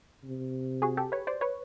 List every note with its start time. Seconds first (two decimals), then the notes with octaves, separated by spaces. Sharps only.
0.23 C3
0.82 F#4 G#4
0.97 G4 A4
1.12 B4 C#5
1.27 C5 D5
1.41 B4 C#5